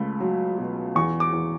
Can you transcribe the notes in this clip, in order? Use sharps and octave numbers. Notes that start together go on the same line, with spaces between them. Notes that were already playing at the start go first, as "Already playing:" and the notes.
Already playing: C#2 A3 B5
F#3
B2
E2 C#6
D6
E2